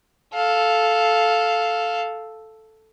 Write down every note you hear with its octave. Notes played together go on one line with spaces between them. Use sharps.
A4 F5